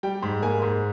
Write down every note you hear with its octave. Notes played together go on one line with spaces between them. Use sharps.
G3 G5
G#2
A#3 G#5
G#2